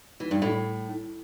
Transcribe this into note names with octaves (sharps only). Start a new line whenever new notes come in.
E3
G2
A2